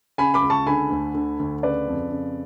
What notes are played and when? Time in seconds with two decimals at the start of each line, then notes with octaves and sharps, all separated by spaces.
0.18 C#3 G#5 B5
0.34 B5 D6
0.42 C#2
0.50 A5 C#6
0.66 D3 G#5 B5
0.90 D2
1.15 D3
1.40 D2
1.63 C#3 B4 D5
1.88 F2
2.11 C#3